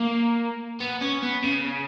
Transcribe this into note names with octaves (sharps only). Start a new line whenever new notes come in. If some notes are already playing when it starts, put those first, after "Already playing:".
Already playing: A#3
B3
C#4
B3
C#3